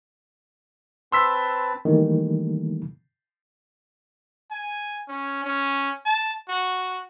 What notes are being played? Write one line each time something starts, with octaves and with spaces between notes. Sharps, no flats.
C4 B4 A5 C6 E6 B6
D#3 E3 G3 A3 A#3
G#5
C#4
C#4
A5
F#4